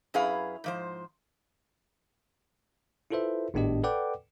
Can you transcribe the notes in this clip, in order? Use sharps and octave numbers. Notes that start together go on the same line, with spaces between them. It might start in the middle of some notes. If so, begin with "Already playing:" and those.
F#2 E4 G#4 B4 F5
G#2 F3 C5
E4 F4 A4 B4 C5 E5
G#1 A2 B3 D4 G4 D#5
A4 B4 D5 F#5 G5 D6